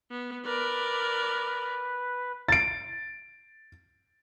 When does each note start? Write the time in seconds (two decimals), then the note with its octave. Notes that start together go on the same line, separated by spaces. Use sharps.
0.11 B3
0.46 A#4 B4 D5
2.48 A6 D7